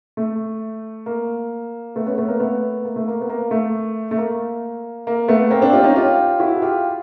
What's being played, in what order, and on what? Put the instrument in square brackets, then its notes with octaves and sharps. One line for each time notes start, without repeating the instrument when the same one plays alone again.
[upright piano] A3
A#3
A3 B3
B3 C#4
A3 B3
A#3
A3 B3
A#3
A3
A#3
B3
A#3
A3
A3
A#3
A#3
A3 B3
A#3 C4
C4 D4
F4 G4
C#4 D#4
F4 G4
E4 F#4
G#4
F4 G4